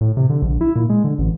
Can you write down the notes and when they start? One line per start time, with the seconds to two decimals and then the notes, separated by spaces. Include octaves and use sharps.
0.01 A2
0.17 C3
0.30 D3
0.42 A#1
0.61 E4
0.76 A#2
0.90 G#3
1.04 D3
1.19 A1